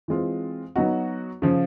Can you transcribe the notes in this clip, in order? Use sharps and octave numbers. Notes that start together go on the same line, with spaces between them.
E3 G#3 C4 F4
F#3 B3 D#4 F#4
C#3 F3